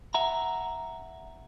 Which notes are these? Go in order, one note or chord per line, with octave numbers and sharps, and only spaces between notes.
E5 F#5 A#5